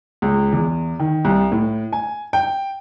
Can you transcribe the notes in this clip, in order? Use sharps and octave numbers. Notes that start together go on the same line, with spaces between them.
C#2
E2
D#3
C2
A2
G#5
G5